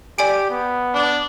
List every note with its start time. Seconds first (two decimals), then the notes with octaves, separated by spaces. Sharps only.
0.18 G4 D5 G#5 D7
0.50 B3
0.94 D4